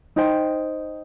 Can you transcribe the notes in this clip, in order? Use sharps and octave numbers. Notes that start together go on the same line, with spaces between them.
D#4 C5 G5